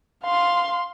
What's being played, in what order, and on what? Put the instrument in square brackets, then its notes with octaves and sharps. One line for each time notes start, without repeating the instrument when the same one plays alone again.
[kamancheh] F5 C6